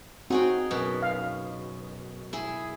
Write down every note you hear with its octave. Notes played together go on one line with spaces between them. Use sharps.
C4 D#4 F#4 G#4 G5
F#2 B2
F5
E4 G#4